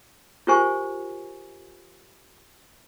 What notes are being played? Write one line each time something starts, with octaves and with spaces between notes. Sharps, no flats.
F4 G4 A#4 C5 G#5 C#6